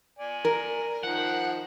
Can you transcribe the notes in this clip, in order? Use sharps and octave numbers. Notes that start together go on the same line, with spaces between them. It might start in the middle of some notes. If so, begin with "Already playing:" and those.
D5 G#5
A#4
D#3 F3 F#5